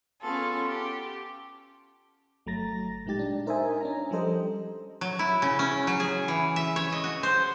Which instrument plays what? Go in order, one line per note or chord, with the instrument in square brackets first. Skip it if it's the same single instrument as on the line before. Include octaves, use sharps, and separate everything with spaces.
[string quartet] B3 C#4 F4 G#4 A4
G4
[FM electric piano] G1 F#3 A3 A#5 A6 A#6
A#2 G#3 D#4 G4 A6
D4
D#4 A#4 C5 D#5 E5 G#5
C#4 D4 A#5
F3 G3 G4 A4 C5 D#5
[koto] F#3
E4
C#3
C#4
F#3
G#4
E3
E5
C#5
D#5
F#4
C5